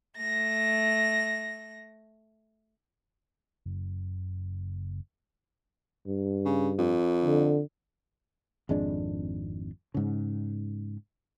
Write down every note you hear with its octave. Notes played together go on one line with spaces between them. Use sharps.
A3 A#6
F#1
G2
C#3
F2
D3
G#1 F2 G#3 D4
G#2 C#3